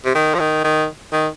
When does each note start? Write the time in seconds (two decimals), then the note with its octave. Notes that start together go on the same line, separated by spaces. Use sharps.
0.05 C3
0.15 D#3
0.34 F3
0.40 D#3
0.64 D#3
1.13 D#3